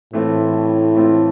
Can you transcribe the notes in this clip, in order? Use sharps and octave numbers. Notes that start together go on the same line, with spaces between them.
A2 E3 A3 C4 F4
E3 A3 C4 F4